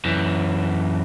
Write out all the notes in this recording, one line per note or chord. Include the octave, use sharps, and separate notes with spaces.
F#2 E3